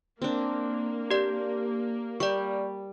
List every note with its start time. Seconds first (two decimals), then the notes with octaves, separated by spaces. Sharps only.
0.22 A#3 C4 D4
1.11 G4 D5
2.20 G3 D5 C#6